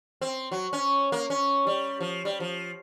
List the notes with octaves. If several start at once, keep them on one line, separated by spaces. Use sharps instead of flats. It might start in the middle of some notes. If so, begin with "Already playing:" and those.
C4
F#3
C#4
A#3
C#4
G3
F3
G3
F3